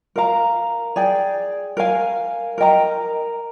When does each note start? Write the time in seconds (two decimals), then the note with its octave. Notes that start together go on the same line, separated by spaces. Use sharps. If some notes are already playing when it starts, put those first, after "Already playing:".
0.16 A#4 F5 A#5
0.96 G#4 D5 G5
1.77 A#4 F5 G#5
2.58 A#4 D#5 G5 A#5